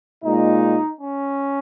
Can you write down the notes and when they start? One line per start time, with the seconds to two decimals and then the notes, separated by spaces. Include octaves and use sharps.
0.24 A#2 G#3 D#4
1.00 C#4